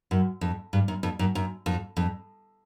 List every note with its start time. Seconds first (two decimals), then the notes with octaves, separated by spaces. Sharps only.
0.11 F#2
0.41 F2
0.73 G2
0.88 F#2
1.03 F2
1.19 F#2
1.35 F#2
1.66 F2
1.97 F2